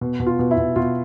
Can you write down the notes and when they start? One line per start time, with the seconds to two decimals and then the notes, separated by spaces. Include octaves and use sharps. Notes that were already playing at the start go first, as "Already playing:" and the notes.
0.01 B2
0.20 B2
0.27 F4
0.39 B2
0.51 E4
0.58 B2
0.76 B2 F4